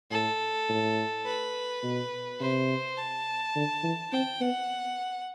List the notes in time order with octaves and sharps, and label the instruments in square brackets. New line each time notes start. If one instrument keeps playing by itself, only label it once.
[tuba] A2 [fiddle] A4
[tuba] A2
[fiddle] B4
[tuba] B2
[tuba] C3 [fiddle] C5
[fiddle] A5
[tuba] D3
E3
[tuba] C4 [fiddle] G5
[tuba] B3 [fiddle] F#5